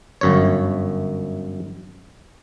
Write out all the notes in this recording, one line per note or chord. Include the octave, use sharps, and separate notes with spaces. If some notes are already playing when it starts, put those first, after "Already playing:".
G1 F#2 C#5